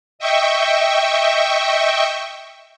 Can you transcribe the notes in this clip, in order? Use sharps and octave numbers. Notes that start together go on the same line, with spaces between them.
D#5 E5 G5 C#6